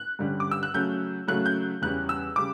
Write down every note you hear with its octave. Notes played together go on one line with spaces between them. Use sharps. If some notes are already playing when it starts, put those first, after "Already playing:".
Already playing: F#6
G2 D3 G3 C#4
D6
E6
F#6
C#3 F#3 A3 C#4 G6
C#3 F#3 A3 C#4 F#6
G6
E2 C#3 G3 C#4 F#6
E6
C#3 G3 D6